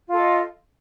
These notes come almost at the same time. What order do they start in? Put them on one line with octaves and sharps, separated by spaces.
F4 A4 D#5